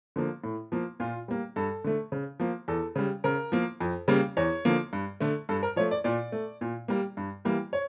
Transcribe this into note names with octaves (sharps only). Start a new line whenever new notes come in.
D3 F3 A#3
A2
F3 A#3
A#2 F4
G3 A#3
G2 A4
D3 A3
C#3
F3 A#3
E2 A4
C#3 G3
C#3 A#4
F3 A#3
F2
C#3 G3 A#3
E2 C#5
D3 F3 A#3
G2
D3 A3
G2 A4
A#4
F3 A3 C#5
D5
A#2 D5
A3
A#2
G3 A#3
G2
E3 G3 A#3
C#5